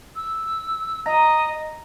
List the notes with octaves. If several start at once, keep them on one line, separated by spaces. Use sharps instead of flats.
E6
D#5 A#5